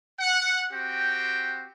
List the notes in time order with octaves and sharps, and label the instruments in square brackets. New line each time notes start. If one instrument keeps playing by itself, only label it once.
[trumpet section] F#5
C4 F#4 G4 G5